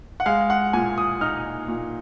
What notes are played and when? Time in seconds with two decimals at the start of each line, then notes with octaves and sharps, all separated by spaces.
0.20 F#5
0.26 G#3 F5
0.50 F#5
0.73 A#2 G#5
0.98 D#6
1.21 D#4 F6
1.68 A#2